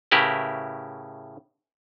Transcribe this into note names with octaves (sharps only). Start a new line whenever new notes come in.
A2 C#3 E4 G4 A#4 B4